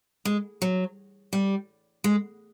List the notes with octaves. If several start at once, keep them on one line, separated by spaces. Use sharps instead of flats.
G#3
F#3
G3
G#3